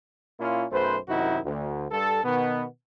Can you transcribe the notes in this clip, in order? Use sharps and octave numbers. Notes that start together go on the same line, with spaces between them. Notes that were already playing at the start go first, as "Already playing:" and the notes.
A#2 A#3 C#4 E4 F4
B1 F#2 A3 B4 C5
F#2 C3 D#3 D#4 E4 F#4
D2
G2 A4
B2 D#3 B3